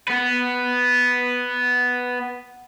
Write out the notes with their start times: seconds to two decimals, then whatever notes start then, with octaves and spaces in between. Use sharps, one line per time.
0.08 B3 B4